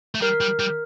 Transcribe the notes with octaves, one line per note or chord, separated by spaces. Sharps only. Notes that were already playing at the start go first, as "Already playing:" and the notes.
A3
G3 A#4
G3
G3